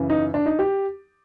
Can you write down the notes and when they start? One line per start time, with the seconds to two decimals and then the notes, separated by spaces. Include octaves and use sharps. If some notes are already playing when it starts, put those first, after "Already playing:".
Already playing: F#2 C#3 E3
0.10 D#4
0.34 D4
0.46 D#4
0.59 G4